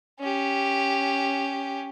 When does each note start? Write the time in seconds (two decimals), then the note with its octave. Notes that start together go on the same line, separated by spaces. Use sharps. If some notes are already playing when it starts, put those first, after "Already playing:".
0.20 C#4 G4